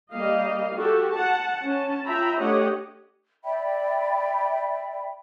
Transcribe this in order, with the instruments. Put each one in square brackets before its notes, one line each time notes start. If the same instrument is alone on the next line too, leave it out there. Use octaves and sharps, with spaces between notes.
[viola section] G3 A#3 D#5 F5
F#4 G4 A4
F#5 A5
C#4 A5
F4 E5 G5 A#5 B5
A3 D4 G4 C#5 D#5 F#5
[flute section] D5 E5 G5 B5